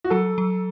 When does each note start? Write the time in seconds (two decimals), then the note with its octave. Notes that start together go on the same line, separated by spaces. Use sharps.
0.04 F#4
0.10 F#3 A4
0.38 F#3